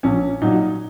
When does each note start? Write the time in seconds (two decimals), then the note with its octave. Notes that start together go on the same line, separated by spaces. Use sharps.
0.03 A#1 C#4
0.41 A#2 F#3 D#4